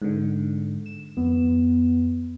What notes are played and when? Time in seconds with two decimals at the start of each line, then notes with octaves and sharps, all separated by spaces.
0.02 G#2 D3
0.86 E7
1.17 F2 B3